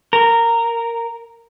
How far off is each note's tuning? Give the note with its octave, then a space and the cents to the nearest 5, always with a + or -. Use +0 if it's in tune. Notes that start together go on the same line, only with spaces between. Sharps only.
A#4 -10